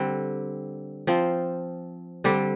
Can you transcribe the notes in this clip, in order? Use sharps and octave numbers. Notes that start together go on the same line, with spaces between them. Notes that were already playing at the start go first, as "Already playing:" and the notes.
Already playing: D3 G3 C4
F3 C4 F4
D3 G3 C4 G4